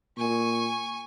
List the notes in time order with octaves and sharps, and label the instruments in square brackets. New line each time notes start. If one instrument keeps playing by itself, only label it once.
[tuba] A#2 [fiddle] G#5 C#6